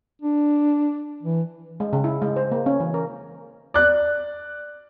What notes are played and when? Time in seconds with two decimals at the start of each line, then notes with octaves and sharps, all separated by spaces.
0.22 D4
1.23 E3
1.80 G#3
1.93 C#3
2.04 E4
2.22 G#3
2.36 C5
2.52 A#3
2.66 C#4
2.80 E3
2.94 A#4
3.74 D5 F#6